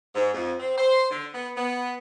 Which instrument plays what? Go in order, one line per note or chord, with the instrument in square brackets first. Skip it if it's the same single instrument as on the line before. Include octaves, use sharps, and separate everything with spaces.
[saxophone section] G#2
F2
C4
C5
D3
B3
B3